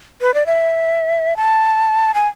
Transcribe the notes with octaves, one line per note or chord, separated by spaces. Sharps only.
B4
D5
E5
A5
G#5